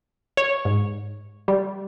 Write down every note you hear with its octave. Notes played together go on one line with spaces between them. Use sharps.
C#5
G#2
G3